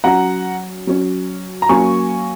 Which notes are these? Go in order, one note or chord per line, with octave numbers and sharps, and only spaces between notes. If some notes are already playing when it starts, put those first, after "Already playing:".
F#3 C#4 F#5 A#5
F#3 C#4
A#5
F#3 A#3 C#4 G#5 C#6